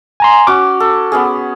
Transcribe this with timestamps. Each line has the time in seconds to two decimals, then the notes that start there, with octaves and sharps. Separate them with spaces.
0.20 G#5 A#5 C6
0.47 C#4 F#4 D6
0.80 A4
1.12 B3 C#4 G#4